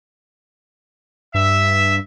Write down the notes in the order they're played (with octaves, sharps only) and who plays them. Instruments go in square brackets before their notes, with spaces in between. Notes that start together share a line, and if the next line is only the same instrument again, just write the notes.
[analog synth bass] G2 [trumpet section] E5